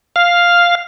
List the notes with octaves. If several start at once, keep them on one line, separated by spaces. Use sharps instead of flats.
F5